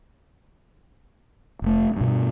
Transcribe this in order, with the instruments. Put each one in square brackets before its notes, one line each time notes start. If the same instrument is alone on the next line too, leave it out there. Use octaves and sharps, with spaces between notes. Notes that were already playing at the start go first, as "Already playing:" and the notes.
[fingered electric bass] F1 A3
G2 B2